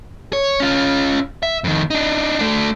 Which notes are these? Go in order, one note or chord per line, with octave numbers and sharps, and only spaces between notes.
C#5
C#4 F4
E5
F2 D#3
D4 D#4
A3 D4